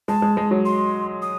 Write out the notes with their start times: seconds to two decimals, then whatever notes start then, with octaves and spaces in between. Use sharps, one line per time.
0.08 G#3 A5
0.22 G#3
0.37 G#3
0.51 F#3
0.65 C6
1.22 D#6